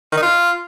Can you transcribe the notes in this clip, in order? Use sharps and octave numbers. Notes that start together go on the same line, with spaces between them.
D#3
D#4
F4